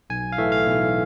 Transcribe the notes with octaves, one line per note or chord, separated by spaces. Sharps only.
B1 G#5
F5
A2 E3 A3 E5
F5
B1